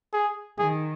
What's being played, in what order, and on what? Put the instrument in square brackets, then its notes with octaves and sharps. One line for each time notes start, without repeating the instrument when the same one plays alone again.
[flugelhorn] G#4
[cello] D#3 [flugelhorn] G#4